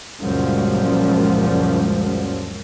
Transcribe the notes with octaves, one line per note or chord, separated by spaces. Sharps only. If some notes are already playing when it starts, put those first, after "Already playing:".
F#1 C#2 F#2 A#2 F3 G3